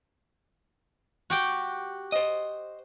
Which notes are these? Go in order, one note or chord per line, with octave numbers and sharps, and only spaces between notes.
F#4 G4 G5
C5 D#5